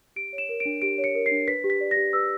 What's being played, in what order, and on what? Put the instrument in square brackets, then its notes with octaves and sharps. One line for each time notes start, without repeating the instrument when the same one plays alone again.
[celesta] G4 D7
C#5
E7
A#4
D7
D4
G4 D7
C#5
C#7
A#4
C7
D4
B4 B6
G4
B6
D5
A#6
G4
B4 E6